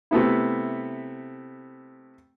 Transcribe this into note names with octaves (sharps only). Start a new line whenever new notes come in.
C3 A3 B3 E4